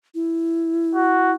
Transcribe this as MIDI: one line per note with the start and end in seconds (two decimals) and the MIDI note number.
0.15 1.35 64
0.95 1.33 66